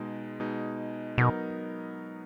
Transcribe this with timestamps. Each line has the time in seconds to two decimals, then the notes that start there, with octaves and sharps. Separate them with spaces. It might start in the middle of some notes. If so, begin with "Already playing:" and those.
Already playing: B2 G#3 D#4
0.40 B2 G#3 D#4
1.18 B2 F#3 B3 D#4 A#4